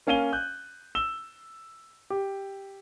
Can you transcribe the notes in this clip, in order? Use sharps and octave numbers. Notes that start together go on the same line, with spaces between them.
A#3 C#4 F5 G#5 D#7 G7
F#6 G6
E6 E7 G7
G4